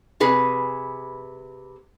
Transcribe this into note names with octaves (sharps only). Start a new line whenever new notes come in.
C3 G#4 B4 G#5